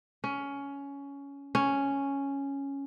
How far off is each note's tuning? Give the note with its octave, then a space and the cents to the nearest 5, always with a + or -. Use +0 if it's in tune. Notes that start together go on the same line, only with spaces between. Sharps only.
C#4 +15
C#4 +0